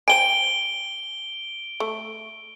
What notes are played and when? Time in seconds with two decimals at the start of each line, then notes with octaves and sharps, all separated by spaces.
0.08 C5 G5 G#5 D7 G7
1.80 A3